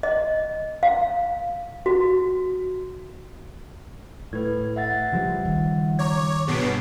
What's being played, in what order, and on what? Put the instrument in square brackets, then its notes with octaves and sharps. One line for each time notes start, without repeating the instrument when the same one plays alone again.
[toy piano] D#5
F5
F#4
[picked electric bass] A2 [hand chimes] B4 G#6
[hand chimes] E5 F#5 A6
[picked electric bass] C#3 F3 G3
[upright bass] D#3
[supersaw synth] C#5 [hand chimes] A#5 D6 G#6
[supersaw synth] G2 B2 B3 [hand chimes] G#4 C7 D7